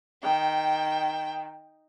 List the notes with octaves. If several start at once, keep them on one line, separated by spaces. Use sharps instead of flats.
D#3 G5